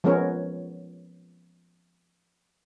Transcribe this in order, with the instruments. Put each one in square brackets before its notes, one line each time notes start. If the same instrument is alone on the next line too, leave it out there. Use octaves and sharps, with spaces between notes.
[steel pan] F3 G#3 B3 C#4 A#4 C#5